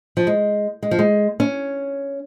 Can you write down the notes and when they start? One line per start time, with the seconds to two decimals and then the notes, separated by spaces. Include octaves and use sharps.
0.17 F3
0.27 G#3
0.83 G#3
0.91 F3
0.99 G#3
1.40 C#4